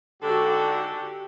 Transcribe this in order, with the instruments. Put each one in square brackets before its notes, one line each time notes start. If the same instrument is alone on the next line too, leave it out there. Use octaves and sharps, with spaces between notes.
[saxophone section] G#2 D3 [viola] F#4 A4 [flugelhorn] G4